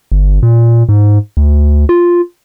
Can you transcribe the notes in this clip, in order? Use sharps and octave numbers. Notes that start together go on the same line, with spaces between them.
G1
A#2
G#2
D2
F4